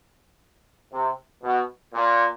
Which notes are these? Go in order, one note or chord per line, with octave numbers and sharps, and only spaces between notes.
C3
B2
A#2